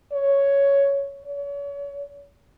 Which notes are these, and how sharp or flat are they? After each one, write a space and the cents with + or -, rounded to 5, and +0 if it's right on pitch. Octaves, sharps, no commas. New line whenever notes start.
C#5 +5
C#5 +35